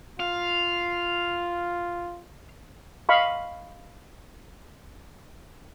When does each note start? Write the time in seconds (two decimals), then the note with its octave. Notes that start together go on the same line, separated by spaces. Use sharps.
0.20 F4 F5
3.09 D#5 F5 B5 C#6